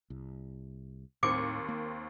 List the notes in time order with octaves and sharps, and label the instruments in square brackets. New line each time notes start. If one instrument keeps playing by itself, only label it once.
[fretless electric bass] C2
[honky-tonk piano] D#2 C4 C#7 [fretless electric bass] A2 [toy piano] D6
[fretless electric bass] A#3